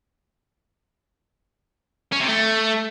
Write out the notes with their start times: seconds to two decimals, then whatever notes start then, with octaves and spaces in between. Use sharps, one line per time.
2.12 C#4
2.20 C3
2.29 A3